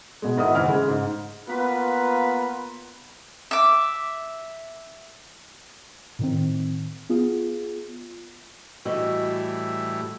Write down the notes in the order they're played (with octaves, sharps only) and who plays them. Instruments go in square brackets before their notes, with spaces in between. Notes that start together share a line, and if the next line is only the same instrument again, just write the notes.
[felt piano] B2 G#3
G#1 E4 A#4 D#5 F#5 D#6
F#1 E3 E4 F#5 F6
C#3 G#3
G#2
[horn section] A#3 B3 F4 B4
[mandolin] E5 D6
[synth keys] A2 D#3 C4
B3 F4 G#4
[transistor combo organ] A2 E3 G3 [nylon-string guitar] F#4 D#5